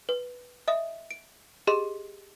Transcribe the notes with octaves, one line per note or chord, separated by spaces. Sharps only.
B4
D#5 E5 D#6
D7
G4 G#4 D#5 C6